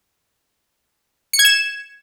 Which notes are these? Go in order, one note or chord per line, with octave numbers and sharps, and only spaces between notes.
C#7
G#6
E7